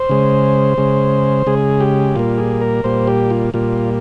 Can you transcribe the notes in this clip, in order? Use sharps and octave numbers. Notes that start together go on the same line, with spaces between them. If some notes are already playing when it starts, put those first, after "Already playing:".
Already playing: C5
C#3 G#3
C#3 G#3
C#3 G#3 G#4
G4
A#2 G3 A#3 F4
G#4
A#4
A#2 G3 A#3 C5
G4
F4
A#2 G3 A#3 F4